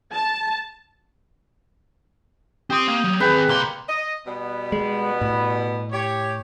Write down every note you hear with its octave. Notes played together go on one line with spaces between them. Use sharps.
A5
C4 G4 C6 D#6
A#3
F#3
D#3 C4 G#4 B4 G5
C2 A#3 D5 A5 C6
D#5
B2 G3 B3
G#3
A2
G4 C#5